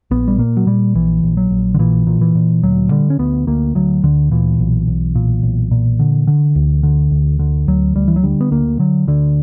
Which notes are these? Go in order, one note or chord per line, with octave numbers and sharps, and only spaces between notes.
A#1 B3
G3
A#2 A#3
F#3
A#2 G3
A#1 E3
A#1
F#3
A#1
D3
A#2 E3
A#2
E3
A#2
D2 F#3
D3 G3
C#4
D2 B3
D2 A#3
D2 F#3
D2 D3
A#2 E3
B1
B1
A#2
B1
A#2
D3
D3
D2
D3
D2
D3
D2 F#3
D2 G3
E3
F#3
D3 G3
B3
D2 A#3
D3 F#3
D2 D3